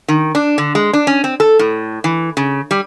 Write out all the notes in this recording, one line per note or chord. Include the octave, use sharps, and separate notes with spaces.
D#3
D4
D3
G#3
D4
C#4
C4
A4
A2
E3
C#3
G3